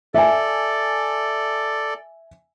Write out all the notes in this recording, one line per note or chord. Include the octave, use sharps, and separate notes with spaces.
A4 D5 E5 G#5